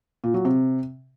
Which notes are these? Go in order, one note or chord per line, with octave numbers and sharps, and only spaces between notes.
A#2
F#3
C3